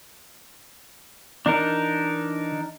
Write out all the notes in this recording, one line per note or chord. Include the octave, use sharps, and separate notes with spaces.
E3 D4 D#4 A#4